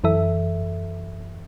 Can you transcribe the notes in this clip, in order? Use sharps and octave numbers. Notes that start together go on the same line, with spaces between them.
F#2 E3 A4 E5